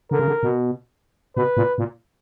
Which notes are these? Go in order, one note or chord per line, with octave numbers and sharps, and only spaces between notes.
D3 A#4
C#3
D3
B2
B2 B4
A#2
A#2